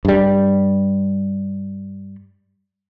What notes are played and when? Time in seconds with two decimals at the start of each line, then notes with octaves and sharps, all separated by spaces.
0.05 G2 G3